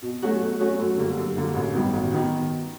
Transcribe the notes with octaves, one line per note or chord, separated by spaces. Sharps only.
B2
F#3 A3 C#4 F#4
B2
F#3 A3 C#4 F#4
F#2
D3 G3 A#3
F#2
D3 G3 A#3
A1
G2 D#3 F#3 B3
A1
D#3 F#3 B3